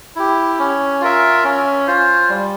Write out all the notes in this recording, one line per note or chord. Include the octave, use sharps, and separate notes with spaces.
E4 G4
C#4
F4 A#4 E5
C#4
F4 C5
G3